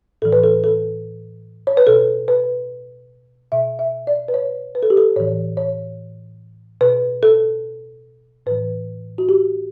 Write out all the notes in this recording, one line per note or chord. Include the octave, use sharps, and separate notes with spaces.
A2 E3 A4
B4
A4
A4
C#5
B4
B2 A4
B4
B2 E5
E5
D5
B4
C#5
B4
A4
G4
A4
A2 E3 C#5
C#5
B2 B4
A4
A2 E3 B4
F#4
G4